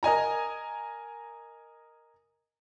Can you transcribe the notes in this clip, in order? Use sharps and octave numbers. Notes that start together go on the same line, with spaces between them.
A#4 D#5 G#5 A#5